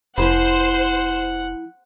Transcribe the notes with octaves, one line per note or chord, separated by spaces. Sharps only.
F1 F3 E4 C5 F#5 B5